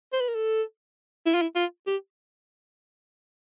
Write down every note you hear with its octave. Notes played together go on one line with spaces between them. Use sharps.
C5
B4
A#4
A4
E4
F4
E4
F4
G4